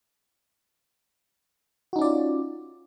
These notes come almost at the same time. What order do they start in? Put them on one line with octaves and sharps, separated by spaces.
F#4 D#4 C#4 D5 F4